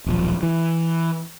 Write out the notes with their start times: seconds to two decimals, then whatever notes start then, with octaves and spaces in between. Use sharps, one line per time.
0.06 D#1 B1 A2 F3
0.43 E3